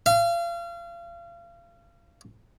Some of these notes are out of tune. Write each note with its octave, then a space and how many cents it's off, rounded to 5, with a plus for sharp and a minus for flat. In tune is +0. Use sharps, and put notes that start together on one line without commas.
F5 -35